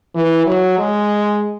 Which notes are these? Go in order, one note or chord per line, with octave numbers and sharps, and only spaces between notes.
E3
F#3
G#3